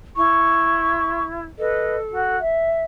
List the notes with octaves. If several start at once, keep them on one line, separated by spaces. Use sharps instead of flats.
E4 C#6
A4 B4 D#5
F#4
E5